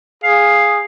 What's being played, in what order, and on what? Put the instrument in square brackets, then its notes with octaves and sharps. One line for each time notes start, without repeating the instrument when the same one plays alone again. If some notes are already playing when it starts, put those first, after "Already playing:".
[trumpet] G#4 [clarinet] F5